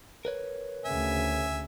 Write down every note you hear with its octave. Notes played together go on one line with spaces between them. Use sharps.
A#4 B4 C#5
D2 C#3 E5 G#5